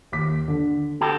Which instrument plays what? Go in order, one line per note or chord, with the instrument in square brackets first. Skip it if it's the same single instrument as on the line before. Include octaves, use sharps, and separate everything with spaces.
[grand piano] D#2 D6 B6
D3
[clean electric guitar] F#4 G4 A4